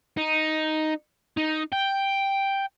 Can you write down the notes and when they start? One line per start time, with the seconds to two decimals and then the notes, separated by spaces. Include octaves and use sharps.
0.17 D#4
1.37 D#4
1.73 G5